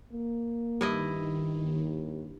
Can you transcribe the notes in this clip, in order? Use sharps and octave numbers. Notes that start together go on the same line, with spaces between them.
A#3
G2 D#3 E4 D#5
D#2